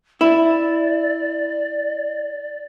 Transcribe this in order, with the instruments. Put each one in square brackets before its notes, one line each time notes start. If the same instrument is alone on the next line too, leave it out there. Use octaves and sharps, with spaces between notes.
[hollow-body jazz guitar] E4 [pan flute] D5